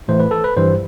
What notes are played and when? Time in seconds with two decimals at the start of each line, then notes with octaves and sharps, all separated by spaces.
0.08 A2 E3 A3 C5
0.20 B4
0.31 A4
0.44 B4
0.57 G2 E3 G3 C5